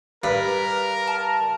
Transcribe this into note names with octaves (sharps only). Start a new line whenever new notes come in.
G2 A#4 B4 F#6
A5